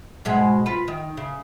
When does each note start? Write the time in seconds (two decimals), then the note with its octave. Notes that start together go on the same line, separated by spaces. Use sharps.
0.25 G#2 B2 G#3
0.66 F4 B4
0.88 D#3
1.17 C#3